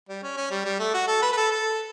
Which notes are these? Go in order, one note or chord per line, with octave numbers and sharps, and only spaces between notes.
G3
C#4
C#4
G3
G3
A3
F#4
A4
B4
B4
A4
A4